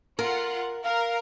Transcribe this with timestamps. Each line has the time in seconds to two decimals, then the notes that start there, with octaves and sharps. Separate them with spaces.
0.19 F4 A#4 F#5
0.84 A#4 F5